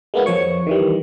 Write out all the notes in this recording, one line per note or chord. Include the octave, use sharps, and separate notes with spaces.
G#3 A#3 B3 E4
F2 F3 C#5 C#6
D#3 E3 G3